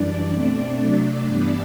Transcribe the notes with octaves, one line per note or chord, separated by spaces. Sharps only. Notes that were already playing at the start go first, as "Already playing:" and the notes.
Already playing: F#2 E3 G3 D4 D5
B2 A3 C4
C3 F#3 A3
G2 E3 G3 B3